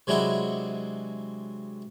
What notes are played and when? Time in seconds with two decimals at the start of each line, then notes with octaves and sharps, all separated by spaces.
0.07 C3 F#3 G#3 D4 E4 F#4